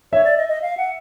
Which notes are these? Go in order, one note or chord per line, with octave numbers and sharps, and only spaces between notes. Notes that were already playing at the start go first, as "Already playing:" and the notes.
C#5 E5
D5
D#5
D#5
F5
F#5